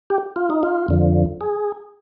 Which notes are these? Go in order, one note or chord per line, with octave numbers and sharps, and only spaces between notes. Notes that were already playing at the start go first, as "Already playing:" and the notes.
G4
F4
D#4
F4
F2 D3 F3
G#4